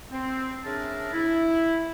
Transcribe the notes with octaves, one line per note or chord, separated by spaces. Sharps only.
C4
C#4 D4 G#4 A#4 E5 A5
E4